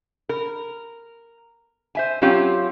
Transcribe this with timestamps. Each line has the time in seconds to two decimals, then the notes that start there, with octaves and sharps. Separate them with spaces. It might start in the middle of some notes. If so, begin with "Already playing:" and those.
0.29 A#4
1.95 C5 E5 G#5
2.22 F#3 C4 C#4 F4 G4